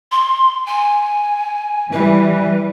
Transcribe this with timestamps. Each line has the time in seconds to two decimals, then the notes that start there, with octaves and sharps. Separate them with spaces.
0.11 C6
0.66 G#5
1.92 E3 G3 B4